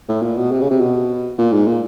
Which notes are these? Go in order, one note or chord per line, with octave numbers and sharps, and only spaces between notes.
A2
A#2
B2
C3
C#3
C3
B2
A#2
G#2
A#2